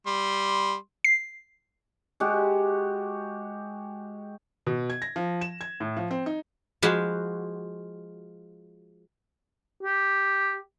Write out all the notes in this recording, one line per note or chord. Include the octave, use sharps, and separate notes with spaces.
G3 C6
C7
G#3 F#4 G4
B2
G#6
A#6
F3
E7
G#6
A2
F3
C4
D#4
F3 G#3 F#4 B5
G4